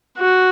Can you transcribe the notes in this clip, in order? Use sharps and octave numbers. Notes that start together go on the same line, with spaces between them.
F#4